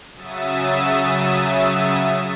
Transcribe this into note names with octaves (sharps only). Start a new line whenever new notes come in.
C#3 F#3 E5 D#6 E6 A6